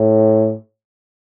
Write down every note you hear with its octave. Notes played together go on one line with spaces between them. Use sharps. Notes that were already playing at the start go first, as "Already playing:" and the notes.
Already playing: A2